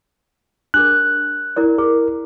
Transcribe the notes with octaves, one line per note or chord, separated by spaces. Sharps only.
D4 G#4 A#4 F#6
E4 A#4 D5
G#4 A#4